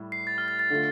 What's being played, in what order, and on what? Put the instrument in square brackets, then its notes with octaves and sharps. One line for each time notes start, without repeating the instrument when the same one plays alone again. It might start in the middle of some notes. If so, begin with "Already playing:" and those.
Already playing: [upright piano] A2 G3
[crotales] C7
A6
F6
A6
A6
[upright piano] D3 A3 F4